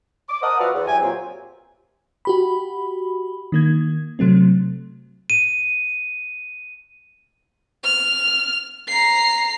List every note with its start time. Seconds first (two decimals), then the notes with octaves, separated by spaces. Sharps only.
0.28 D6
0.42 A#4 C5 F#5 A5 D#6
0.59 F3 F#4 B4 D5 E5 F5
0.74 E2
0.86 F#3 E4 G4 G#5
1.01 A#2 F#3 C4 F4 G4
2.25 F#4 G4 B5
3.52 D#3 A#3 G#6
4.19 C3 F#3 A3 C4
5.30 D#7
7.84 F6
8.88 A#5 C7